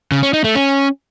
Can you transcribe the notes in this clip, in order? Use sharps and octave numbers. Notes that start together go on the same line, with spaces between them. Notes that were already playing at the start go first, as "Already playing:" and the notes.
C#3
C#4
D#4
A3
C#4